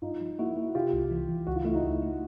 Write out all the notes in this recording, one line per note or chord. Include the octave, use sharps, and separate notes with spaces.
G2 D#4 F4
F3
A#3 E4 F#4
A#3
C3 F4 G4
C2
E3
E3
C#2 F#4
F4
A3 E4
D#4 F4
C#2
A3